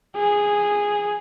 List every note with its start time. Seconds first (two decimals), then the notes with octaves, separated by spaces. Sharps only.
0.15 G#4